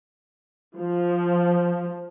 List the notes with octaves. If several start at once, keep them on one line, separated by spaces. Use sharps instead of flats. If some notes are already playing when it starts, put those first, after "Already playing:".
F3